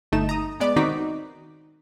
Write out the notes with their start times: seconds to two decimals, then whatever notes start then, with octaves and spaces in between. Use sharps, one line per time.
0.12 G1 A3 D#4 E7
0.29 A#5 D#6
0.60 G#3 B3 D5
0.76 D#3 C4 D#4 F#4 D6 B6